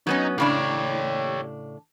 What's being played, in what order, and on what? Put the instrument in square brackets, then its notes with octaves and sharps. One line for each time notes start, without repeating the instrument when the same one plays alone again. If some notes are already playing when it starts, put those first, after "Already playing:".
[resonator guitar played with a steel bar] F#3 B3 C#4 [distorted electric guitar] D#4
[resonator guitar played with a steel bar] A2 C#3 D4 [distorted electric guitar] G4 C#5